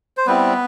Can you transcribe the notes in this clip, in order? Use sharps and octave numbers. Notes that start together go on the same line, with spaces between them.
C5
G3 B3 C4 E4 B4